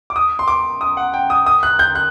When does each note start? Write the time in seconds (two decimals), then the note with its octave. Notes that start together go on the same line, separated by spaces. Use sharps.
0.10 D6
0.16 D#6
0.39 C6
0.48 D6
0.81 D#6
0.97 F#5
1.14 G5
1.30 D#6
1.46 D#6
1.63 F#6
1.79 G6
1.95 F#6